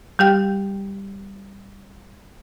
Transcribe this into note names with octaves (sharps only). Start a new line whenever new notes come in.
G3 G4 G5